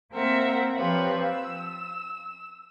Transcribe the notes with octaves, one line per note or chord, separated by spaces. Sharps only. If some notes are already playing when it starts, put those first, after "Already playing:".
A#3 C4 A#4 E5 F#5
F3 C4 F4 G4 B4 C#5
E6